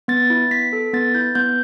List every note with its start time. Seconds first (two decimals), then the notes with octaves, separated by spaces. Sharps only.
0.08 B3 A6
0.30 E4
0.51 B3 B6
0.73 A4
0.93 B3 A6
1.15 E4 G6
1.35 B3 G6